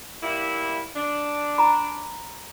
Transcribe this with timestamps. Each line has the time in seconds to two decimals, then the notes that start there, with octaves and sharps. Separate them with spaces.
0.22 G3 A#3 E4
0.96 D4
1.58 A#5 B5